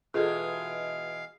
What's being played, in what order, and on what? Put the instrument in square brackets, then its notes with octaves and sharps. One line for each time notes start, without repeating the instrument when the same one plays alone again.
[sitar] B2 E3 G#3 [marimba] F4 [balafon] G#4 A4 [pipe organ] F5